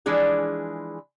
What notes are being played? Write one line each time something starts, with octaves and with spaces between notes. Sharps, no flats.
E3 F3 G#3 D4 G#4